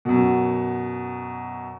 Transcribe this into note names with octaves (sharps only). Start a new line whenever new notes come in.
F#2 B2